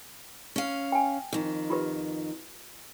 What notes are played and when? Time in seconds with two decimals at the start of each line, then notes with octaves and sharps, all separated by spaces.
0.56 C#4 F5
0.92 G5 G#5
1.33 F2 D#3
1.70 F4 G4 B4